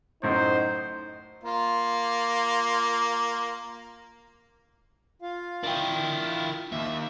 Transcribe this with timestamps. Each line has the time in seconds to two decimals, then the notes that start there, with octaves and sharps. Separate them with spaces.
0.23 F#2 A2 D#4 C5
1.43 A#3 F4
5.22 F4 F5
5.64 D4 E4 A#4 G5
6.72 D#2 E5